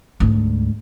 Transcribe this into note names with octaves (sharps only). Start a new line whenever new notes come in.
D2 G#2